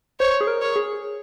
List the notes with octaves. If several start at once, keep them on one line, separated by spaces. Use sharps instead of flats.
C5 C#5
G#4
A#4
C#5
G#4